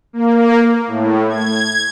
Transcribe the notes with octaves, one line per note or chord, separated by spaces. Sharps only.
A#3
A2
G#6